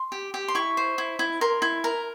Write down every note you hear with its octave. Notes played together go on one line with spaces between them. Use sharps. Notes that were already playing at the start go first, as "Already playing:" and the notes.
Already playing: C6
G4
G4
C6
E4 C#6
C5
E4
E4
A#4 C6
E4
A#4 A#5